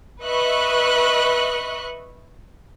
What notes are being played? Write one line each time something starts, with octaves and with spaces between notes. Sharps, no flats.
B4 D#5 E5 C#6 F#6